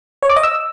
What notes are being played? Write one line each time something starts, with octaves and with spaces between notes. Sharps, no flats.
C#5
D6
D#5
E6